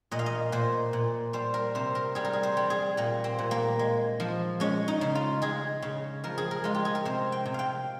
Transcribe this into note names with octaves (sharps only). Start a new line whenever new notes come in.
A#2 D#5
F5
D#5
A#2 C5
A#2
G3 C5
A#4
C3 C5
A#4
G3 G#4
A#4
G#4
C5
G3
G#4
A#2 A#3
C4
A#2
A#3
G#3
F3
G#3 C#4
D#4
C#3
F4
G#3 G#4
C#3
F3 A#4
G#4
A#4
G#3 F4
G4
G#4
A#4
C3 C5
G5
C3
F5 G5